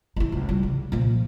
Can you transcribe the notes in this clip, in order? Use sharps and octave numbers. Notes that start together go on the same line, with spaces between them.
D#4 E4
C#2
G3
C#3
A#2 F3